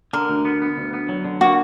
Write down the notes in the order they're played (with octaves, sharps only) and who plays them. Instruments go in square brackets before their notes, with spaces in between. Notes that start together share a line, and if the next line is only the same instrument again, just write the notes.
[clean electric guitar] D3 [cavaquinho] A#4
[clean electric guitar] D2
B3
B3
D2
B3
F#3
D3
[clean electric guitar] A#3 [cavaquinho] F#4